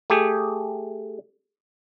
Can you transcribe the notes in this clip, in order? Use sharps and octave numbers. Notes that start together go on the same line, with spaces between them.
A3 G4 G#4